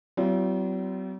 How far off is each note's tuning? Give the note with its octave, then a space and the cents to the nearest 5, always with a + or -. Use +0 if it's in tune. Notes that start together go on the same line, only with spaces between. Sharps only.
F#3 +45 C4 -35 F4 -40